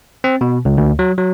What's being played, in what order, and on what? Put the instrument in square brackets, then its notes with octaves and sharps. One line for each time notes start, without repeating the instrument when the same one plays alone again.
[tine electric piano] C4
B2
C#2
D2
F#3
F#3